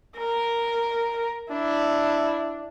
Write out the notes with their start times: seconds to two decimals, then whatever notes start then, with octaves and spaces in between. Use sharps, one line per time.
0.18 A#4
1.51 D4 E4